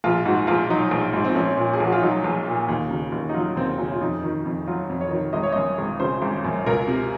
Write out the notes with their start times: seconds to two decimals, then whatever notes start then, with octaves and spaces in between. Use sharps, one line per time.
0.04 A#1 F4
0.26 G#2 F#4
0.47 A#1 F4
0.70 F#3 D#4
0.91 A#1
1.14 G#2
1.24 C4
1.35 A#1 C#4
1.57 A#2
1.74 G#4
1.80 A#1 F#4
1.92 F4
2.02 F#3 D#4
2.24 A#1
2.47 A#2
2.69 D#2
2.91 C#3
3.12 D#2
3.29 D#4
3.34 F#3 F4
3.56 D#2 C4
3.78 C#3 C#4
3.92 F4
4.01 F2 D#4
4.23 D#3
4.46 F2
4.67 F#3 F4
4.89 F2
5.01 C#5
5.11 D#3
5.33 G#1 D#5
5.43 C#5
5.52 F#2 D#5
5.78 G#1
6.00 C#3 C5
6.22 G#1
6.44 F#2
6.66 C#2 A#4
6.88 C3